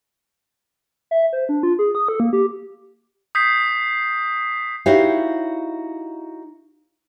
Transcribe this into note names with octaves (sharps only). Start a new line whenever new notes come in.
E5
C5
D4
F4
G#4
D#6
A4
A#3
G4
D#6 G6 B6 C7
D#4 E4 F#4 G4 C#5 F5